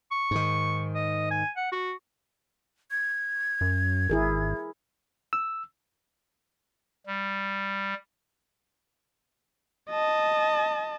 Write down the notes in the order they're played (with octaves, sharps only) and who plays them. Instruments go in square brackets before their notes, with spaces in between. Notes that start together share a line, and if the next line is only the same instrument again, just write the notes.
[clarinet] C#6
[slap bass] G#2 D#3
[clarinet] D#5
G#5
F#5
F#4
[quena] G#6
[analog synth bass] F#2
[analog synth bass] G#1 [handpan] E4 G#4 A#4
[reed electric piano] E6
[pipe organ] G3
[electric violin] D#5 A5